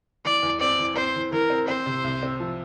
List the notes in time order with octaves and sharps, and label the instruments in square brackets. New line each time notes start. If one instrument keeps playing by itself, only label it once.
[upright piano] E3 [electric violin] D5
[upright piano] E2
[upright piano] C4 [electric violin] D5
[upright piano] E3
[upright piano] C4 [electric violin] C5
[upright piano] E3
[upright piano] E3 [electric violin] A#4
[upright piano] C4
[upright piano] C4 [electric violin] C5
[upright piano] C3
C2
C4
F3